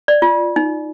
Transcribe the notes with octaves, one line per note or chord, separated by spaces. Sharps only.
D5
F4
D#4